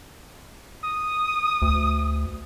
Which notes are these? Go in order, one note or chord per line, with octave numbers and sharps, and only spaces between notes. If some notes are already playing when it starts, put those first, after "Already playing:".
D#6
D2